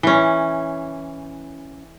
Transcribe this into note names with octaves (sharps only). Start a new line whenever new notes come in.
E3 C#4